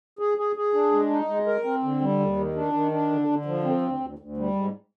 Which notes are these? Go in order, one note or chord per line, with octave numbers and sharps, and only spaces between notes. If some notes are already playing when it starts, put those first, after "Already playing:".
G#4
G#4
G#4
D4
G#3
D#4
G#3
A#4
C4
D3
G3
D#2
D#3
D4
D#3
D4
D3
D3
F3
C4
D2
D2
D2
G3
G#2